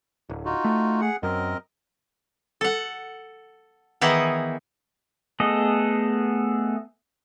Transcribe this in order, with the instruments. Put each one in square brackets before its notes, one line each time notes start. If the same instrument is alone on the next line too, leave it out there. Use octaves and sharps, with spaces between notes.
[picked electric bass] D1
[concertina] D#4 F4 F#4
[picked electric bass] A3
[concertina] G#4 F#5
[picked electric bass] F#2 [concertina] C4 A#4 D#5
[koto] A4 F#5
D#3 E3 B3 D#4 E4 G#4
[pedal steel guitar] A3 B3 G#4 A4 D#5